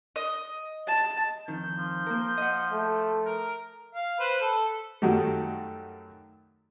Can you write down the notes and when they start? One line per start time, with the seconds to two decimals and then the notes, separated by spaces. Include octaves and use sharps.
0.16 D#5
0.88 A5
1.48 F2 D#3 G6
1.76 F3
2.07 A#3 A#4
2.38 D#5 F#5
2.72 A3
3.26 A#4
3.94 F5
4.19 B4 C5
4.41 A4
5.02 F#2 D#3 F#3 G3 A3